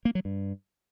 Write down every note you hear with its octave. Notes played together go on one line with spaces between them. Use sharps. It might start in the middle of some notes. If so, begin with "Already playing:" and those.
A#3
F#3
G2